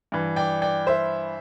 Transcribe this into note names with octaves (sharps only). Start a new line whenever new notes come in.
G2 E3
D5 G5
D5 G5
C5 E5